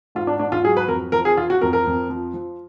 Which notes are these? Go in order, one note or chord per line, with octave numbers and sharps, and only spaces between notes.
G#2 F4
D4
G#2 D4
F4
F#3 G#4
B4
F2 A#4
F3 A#4
G#4
F3 F4
F#4
F2 A#4
A#4
F2
F3
F3